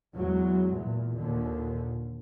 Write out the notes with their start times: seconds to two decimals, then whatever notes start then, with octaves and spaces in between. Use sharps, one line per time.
0.15 E2 F#3 G#3
0.70 E2 A#2
1.15 D#2 A#2 D3